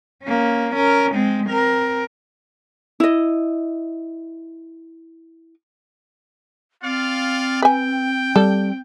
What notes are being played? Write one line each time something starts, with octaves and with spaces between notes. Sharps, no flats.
A#3 C#4
C#4 A#4
G#3 C4
C4 A#4
E4 D#5
C4 F4 D5 F5
B4 G5 G#5
G3 A4